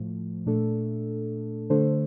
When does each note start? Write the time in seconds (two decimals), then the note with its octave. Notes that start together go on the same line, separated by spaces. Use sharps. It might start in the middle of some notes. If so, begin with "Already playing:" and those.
Already playing: A2 F3 A3
0.46 A#2 A3 D4 A4
1.70 D3 A3 D4 A4 C5